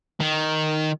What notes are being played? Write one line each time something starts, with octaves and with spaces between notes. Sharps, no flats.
D#3